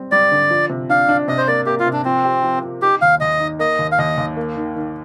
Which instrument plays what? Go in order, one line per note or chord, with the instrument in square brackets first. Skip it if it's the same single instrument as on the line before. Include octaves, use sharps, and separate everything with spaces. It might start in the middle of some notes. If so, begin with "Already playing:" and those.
Already playing: [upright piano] G3 C4
[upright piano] G3 [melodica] D5
[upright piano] D3
F3
C3
[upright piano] D4 [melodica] F5
[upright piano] D4
[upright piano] C3 [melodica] D#5
[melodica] C5
[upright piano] A#3 [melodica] D5
[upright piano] A#3 [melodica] G4
[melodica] F4
[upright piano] C3
[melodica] D4
[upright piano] F3 [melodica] C4
[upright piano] G4
F3
F3
[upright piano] D#4 [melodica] G4
[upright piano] D#2 [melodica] F5
[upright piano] D#2 [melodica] D#5
[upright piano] D#4
[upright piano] A#3 [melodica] D#5
[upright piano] D#2
[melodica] F5
[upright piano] D#2 [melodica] D#5
[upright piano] D#2
A#3
D#3
D#3